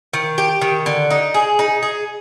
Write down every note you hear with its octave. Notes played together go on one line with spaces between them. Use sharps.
D#3
G4
D#3
D3
D#4
G#4
D#4
G#4